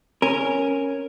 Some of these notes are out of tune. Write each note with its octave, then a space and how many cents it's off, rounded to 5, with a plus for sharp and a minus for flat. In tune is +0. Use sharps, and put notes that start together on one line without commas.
C#4 -5 A#4 -5